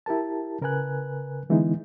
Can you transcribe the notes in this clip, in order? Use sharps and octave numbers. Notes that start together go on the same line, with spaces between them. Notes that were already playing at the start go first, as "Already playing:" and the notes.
E4 G4 A#4 A5
C#3 A#4 B4 G#5 F#6
D3 E3 G#3 B3 D#4 E4